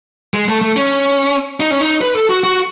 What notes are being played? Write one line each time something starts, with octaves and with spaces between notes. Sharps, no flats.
G#3
A3
A3
C#4
D#4
C#4
D#4
B4
A4
F#4
F#4